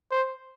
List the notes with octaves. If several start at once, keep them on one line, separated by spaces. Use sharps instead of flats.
C5